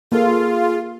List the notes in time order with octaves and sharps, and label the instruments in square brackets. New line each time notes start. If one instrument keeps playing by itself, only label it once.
[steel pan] A#3 A4 [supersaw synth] F4 [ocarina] G#4